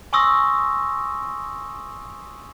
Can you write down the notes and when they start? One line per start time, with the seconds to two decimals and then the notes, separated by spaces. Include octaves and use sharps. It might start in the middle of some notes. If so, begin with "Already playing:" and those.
0.13 G#5 C6 C#6 D#6 E6 A#6